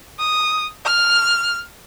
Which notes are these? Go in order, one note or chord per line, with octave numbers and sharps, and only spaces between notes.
D#6
F6